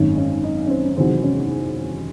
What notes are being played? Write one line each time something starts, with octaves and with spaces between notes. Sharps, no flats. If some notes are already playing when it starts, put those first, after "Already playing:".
Already playing: G#1 F#2 D#3 G#3 C#4
C#4
D#4
C#4
C4
C#4
E1 E2 C3 D#3 F#3 C4
C#4